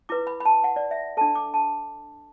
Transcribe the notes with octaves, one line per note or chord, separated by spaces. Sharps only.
E4 B4 D6
B5
B5
A5
F#5
D5
E5
D4 A4 A5
D6
A5